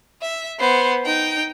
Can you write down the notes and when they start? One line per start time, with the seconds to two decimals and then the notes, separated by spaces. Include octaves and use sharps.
0.22 E5
0.59 B3 C5
1.05 D#4 G5